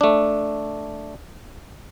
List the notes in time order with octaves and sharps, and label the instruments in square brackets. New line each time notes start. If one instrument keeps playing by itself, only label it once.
[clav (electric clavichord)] A3 D4